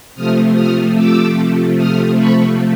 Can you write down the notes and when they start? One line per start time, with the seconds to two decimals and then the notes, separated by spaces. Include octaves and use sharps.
0.14 C3 F3 A3 D#6 F6
0.55 D#6 F6
0.95 D6 E6
1.76 D#6 F6
2.17 B5 C#6